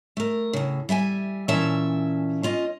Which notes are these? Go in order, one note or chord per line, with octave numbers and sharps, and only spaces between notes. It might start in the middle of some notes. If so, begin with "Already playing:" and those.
A3 A#4
A2 C#3
G3 E5 G5 G#5
A#2 E3 C#4 E5 A5
C#4 F4 D#5